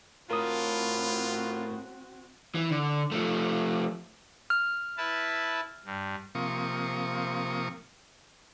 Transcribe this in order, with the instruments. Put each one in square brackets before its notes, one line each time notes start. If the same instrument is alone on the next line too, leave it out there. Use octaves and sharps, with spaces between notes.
[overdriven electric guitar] A2 A4 [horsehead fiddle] C4 F#4 [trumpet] F4 [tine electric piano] A#4 D#6
[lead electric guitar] E3
D3
F3 A3
[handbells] F6
[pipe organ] E4 B4 A5
G2
[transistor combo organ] C3 F3 A#3 C#6 D#6